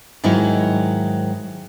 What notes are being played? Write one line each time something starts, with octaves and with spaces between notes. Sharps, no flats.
G#2 D#3 F#3 E4